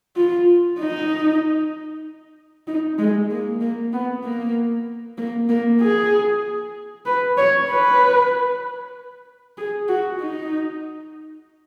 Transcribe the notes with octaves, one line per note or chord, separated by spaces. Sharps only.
F4
D#4
D#4
G#3
A#3
A#3
B3
A#3
A#3
A#3
G#4
B4
C#5
B4
G#4
F#4
D#4